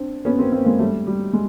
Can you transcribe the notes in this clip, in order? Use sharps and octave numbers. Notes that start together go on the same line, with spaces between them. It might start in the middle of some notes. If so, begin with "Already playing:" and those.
Already playing: C4 D4
B3 C#4
A#3 C4
A#3 C4
G#3 A#3
G3 A3
G3
G#3